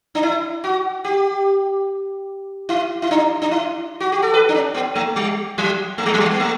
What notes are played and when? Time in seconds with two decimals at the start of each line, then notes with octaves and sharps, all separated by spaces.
0.15 D4
0.23 E4
0.64 F#4
1.04 G4
2.69 E4
3.02 E4
3.11 D4
3.42 D4
3.51 E4
4.00 F#4
4.12 G4
4.22 A4
4.34 B4
4.49 D4
4.54 C#4
4.74 B3
4.95 A3
5.16 G3
5.58 F#3
5.98 A3
6.06 G3
6.14 F#3
6.20 G3
6.31 B3
6.40 A3